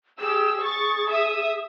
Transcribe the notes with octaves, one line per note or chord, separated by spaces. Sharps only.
G4 G#4 E6
C#6 A6
E5 D#6